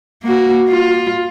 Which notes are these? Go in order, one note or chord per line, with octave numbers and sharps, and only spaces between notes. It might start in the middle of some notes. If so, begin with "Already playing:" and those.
A#3 F#4
F4